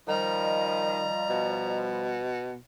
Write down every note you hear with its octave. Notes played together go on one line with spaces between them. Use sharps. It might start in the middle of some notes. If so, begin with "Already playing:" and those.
D#3 F3 G3 D#5 A#5
B2